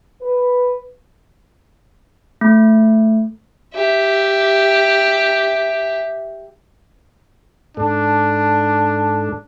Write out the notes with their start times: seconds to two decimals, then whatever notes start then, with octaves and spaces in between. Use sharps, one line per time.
0.22 B4
2.41 A3
3.75 G4 E5
7.77 G#2 D4 A4